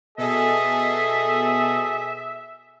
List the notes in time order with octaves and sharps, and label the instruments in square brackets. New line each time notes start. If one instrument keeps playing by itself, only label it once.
[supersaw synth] B2 A4 D#5 [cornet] G#4 [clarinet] E5